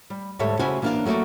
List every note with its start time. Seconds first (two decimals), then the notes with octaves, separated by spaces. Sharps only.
0.10 G3
0.39 D2 G#2 G3 A4 C#5 E5
0.59 C#3 E4 F#4 C5 G#5
0.82 E3 A#3 B3 D4 D5 F5
1.05 F#3 A3 A#3 F#4 D5